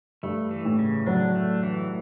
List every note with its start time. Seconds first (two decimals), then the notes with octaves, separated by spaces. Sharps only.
0.23 G2 A3
0.51 E3
0.65 A2
0.79 C#3
1.06 F#3 D4
1.35 A3
1.63 E3